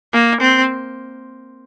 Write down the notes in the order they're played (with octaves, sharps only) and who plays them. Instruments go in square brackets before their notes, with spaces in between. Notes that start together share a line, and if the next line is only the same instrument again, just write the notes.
[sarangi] A#3
C4